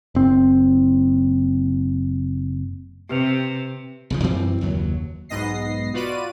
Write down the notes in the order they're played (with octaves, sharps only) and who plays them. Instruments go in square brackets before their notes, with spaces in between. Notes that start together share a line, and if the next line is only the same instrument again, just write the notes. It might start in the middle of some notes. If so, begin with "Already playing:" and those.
[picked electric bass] F#1 C4
[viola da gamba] C3 [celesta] G4 B4 F7
[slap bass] B1 C#3 F3
F#2 E3 G3 C4
F#1 D#2 F#3
[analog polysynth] B1 G#2 B3 D#5 A#6 C7
F4 F#4 B4 D5 D#7